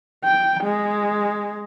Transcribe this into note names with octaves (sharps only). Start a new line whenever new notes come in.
G5
G#3